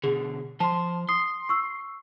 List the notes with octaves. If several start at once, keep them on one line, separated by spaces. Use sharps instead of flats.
B2 D3 G#4
F3 C5 A5 C6
C6 D#6
C#6 E6